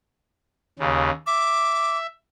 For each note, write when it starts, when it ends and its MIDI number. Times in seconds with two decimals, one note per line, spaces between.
0.79 1.10 39
0.79 1.10 49
1.27 2.07 76
1.27 1.98 86